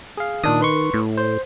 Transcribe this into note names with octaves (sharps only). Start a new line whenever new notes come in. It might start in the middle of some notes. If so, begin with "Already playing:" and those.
G#4 F5
A#2 D#3 D4 D#6
B4 C6 C#6
A2
C5